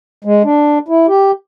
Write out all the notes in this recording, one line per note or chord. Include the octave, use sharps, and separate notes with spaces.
G#3
D4
E4
G4